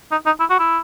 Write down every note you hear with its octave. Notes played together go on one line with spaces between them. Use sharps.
D#4
D#4
E4
F#4
E4